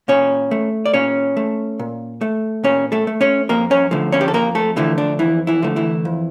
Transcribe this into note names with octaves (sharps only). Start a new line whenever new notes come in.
A#2 C#4 C#5
A3
D5
A#2 C#4 C#5
A3
A#2
A3
A#2 C#4 C#5
A3 A4
A3
C#4 C#5
F2 A#3 A#4
C#4 C#5
D3 F3 A3
C#4 C#5
G4
A4
F2 A#3 A#4
A3 A4
D3 E3 F3 A3 E4
D4
F2 E3 E4
E3 E4
D3 F3 A3
E3 E4
F2